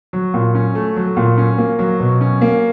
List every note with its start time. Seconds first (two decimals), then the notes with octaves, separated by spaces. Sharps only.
0.13 F#3
0.34 A#2
0.55 C#4
0.75 A3
0.96 F#3
1.17 A#2
1.38 C#4
1.58 A#3
1.79 F#3
2.00 B2
2.21 C#4
2.41 A#3